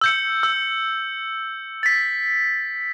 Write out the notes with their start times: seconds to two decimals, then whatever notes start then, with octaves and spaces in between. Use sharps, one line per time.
0.01 E6 G6 C#7
0.43 E6
1.83 A6 B6